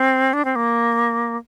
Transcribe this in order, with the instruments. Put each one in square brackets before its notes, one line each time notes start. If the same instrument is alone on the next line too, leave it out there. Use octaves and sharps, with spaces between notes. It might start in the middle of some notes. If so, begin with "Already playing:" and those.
Already playing: [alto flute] C4
D4
C4
A#3